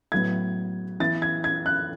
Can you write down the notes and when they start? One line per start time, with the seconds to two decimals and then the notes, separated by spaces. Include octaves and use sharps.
0.12 A2 F#3 B3 G#6
1.00 E3 B3 A6
1.22 G#6
1.44 G#6
1.66 F#6